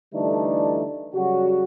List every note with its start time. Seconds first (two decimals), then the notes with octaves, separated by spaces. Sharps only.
0.13 D3 E3 G3 A3 D4 D#4
1.14 C#3 F#3 G3 F#4